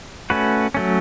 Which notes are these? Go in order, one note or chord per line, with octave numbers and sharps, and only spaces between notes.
A3 C#4 F#4 B4
F#3 A3 C#4